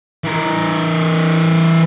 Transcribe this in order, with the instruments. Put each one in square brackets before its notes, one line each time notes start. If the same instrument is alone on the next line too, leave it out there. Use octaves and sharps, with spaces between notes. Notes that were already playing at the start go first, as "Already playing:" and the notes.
[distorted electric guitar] E3 A#4